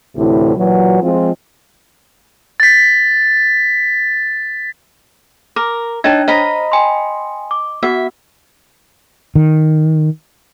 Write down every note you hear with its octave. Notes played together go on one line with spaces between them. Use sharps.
D2 A2 C3 E3 E4
A#2 E3 F#3
F3 G#3 C4 F4
A6 B6
A#4 D6
D4 D#4 C#5 G5 A5
C5 D#5 A#5 B5
G5 G#5 C6
D6
B3 F#4 E5 F#5
D#3